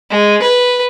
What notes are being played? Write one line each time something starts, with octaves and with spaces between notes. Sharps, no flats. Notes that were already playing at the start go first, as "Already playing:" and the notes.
G#3
B4